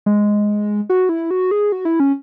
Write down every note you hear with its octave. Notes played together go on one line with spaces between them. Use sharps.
G#3
F#4
E4
F#4
G#4
F#4
E4
C#4